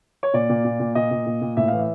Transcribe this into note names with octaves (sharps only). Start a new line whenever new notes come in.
C#5
A#2 D5
A#2
A#2
A#2
A#2 D#5
A#2
A#2
A#2
A2 E5
E3 F5
E5